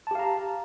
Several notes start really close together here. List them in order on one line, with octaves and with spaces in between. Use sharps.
A5 G4 F5 A#5